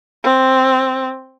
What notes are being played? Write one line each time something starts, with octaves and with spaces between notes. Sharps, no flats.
C4